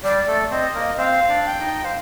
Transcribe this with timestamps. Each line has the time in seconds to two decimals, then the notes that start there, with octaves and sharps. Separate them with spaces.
0.04 G3 G4 D5
0.27 A3 A4
0.51 C4 C5 D#5
0.75 A#3 A#4
0.97 C4 C5 F5
1.29 D4 D5
1.45 G5
1.60 D#4 D#5
1.84 C5 F5